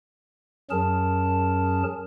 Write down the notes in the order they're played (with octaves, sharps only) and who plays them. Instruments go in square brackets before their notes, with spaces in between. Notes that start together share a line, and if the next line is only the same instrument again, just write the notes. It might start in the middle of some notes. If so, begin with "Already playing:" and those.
[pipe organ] F#2 F#3 C#4 G#4 A#4 A5